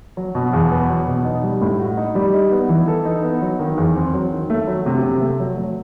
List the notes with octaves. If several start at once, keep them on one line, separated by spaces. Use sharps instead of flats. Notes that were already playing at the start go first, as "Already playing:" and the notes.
F#3
B2
E2
B3
F#3
B2
D#4
G3
A2
F#4
D#4
G3
D#4
B3
E3
A4
D#4
B3
F#3
D#3
E2
C4
F#3
D#3
A3
F#3
C3
C3
A3
F#3
F#3